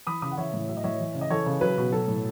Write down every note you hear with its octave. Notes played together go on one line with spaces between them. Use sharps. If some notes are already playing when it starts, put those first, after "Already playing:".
E3 B5 D#6
C#3 B5 D#6
F#5
E3 C#5 E5
A2
F#3 E5
D#5
A2 C#5 E5
E3
C#3
D#5
E3 A4 C#5
C#3
F#3 B4
B2
F#3 A4
A2